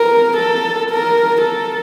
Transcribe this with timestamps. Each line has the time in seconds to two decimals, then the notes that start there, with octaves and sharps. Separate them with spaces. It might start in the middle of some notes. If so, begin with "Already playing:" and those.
Already playing: A#4
0.37 A4
0.90 A#4
1.41 A4